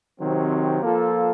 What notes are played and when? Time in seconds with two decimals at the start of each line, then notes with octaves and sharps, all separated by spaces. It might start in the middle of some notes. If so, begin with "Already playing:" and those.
0.20 C3 D#3 F#3 C4
0.82 F3 A#3 F4 A4